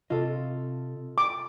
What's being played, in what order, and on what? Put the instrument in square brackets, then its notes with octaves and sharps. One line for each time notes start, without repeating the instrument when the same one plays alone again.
[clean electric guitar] C3 D#5 [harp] F4 A4
[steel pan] D6